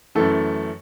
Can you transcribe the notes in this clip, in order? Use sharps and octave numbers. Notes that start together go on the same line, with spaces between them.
F#2 E3 A3 A4